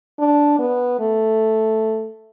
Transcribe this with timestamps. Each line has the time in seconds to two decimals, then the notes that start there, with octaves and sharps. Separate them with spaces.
0.19 D4
0.59 B3
1.00 A3